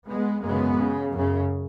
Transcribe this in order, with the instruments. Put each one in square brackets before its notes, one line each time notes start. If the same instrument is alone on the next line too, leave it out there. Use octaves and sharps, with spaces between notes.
[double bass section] G#3 B3
F#2 C#3 G#3 B3
C#3
F#2 C#3